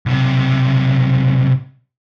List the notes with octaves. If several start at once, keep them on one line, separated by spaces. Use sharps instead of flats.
B1 C3